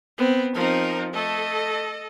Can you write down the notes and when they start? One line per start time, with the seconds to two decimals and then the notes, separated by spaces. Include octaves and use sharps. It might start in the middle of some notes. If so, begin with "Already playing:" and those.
0.18 B3 C4
0.55 F3 C4 D#4 A#4
1.14 A3 A4 D#5